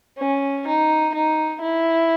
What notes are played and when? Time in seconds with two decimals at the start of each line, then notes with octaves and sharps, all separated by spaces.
0.19 C#4
0.67 D#4
1.14 D#4
1.62 E4